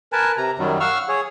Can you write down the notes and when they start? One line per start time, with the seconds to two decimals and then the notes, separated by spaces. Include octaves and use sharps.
0.13 A#4 B4 G#5 A5
0.37 C3 A#5
0.58 F#2 D#3 F#3 G3
0.80 F5 F#5 C#6 E6 F6
1.09 G#4 C#5